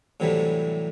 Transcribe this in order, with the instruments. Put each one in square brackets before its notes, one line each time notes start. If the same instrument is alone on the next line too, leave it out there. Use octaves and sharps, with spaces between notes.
[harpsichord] A2 C3 E3 F#3 G3 A3